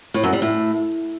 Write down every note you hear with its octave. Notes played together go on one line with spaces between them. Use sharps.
A2
F#2
G3
A2